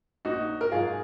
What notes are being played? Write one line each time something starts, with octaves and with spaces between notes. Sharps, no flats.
A#1 D#4 F#4
A#4
G#2 F#3 F4 G#4